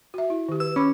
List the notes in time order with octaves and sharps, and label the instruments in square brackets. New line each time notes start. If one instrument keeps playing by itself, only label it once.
[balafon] F#4 E5
E4
D#3 G4
[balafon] B4 [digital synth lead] E6
[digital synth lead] C#4 [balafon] B5 D6